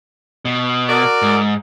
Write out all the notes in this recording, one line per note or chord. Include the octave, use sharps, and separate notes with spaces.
B2
F#4 A#4 D5
G#2